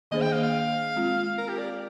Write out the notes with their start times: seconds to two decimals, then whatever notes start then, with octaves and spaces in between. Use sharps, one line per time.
0.11 D#3 A#3 D4 G#4 C5 D#5
0.22 G5
0.32 F5
0.43 F5
0.96 G#3 C4 F4
1.38 A#4
1.48 G4
1.59 D5